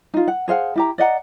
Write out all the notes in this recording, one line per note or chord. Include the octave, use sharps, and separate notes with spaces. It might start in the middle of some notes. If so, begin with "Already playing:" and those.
D#4 F4
F#5
G#4 C5 F5 F#5
E4 G4 A#5
D5 D#5 F#5 A#5